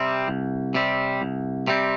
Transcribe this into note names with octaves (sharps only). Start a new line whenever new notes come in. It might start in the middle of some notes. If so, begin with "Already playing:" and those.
Already playing: C3 G3 C4
C2
C3 G3 C4
C2
C3 G3 C4